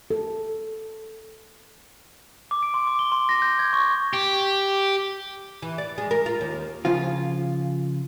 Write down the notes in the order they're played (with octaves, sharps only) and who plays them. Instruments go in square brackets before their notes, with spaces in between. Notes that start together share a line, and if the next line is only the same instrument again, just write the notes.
[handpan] A4
[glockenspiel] D6
D7
C6
D6
G7
C6
A#6
G6
G#6
C#6
[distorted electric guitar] G4
[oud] E3
D5
G#3
A#4
F4
D#2
[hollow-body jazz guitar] C#3 F3 F4